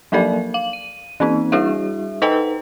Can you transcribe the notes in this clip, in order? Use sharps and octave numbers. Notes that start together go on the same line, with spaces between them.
F3 F#3 A#3 A4 A#4 D5
F5 F#7
D#7
E3 A#3 C4 D#4
G3 D4 E4 F#4 G#4 E5
D#4 A4 B4 D#5 G5 A#5